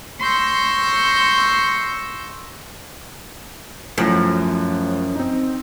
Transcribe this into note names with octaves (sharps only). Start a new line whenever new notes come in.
C6 C#6 E6 G6 A#6
F#2 A2 F3
C4 D#4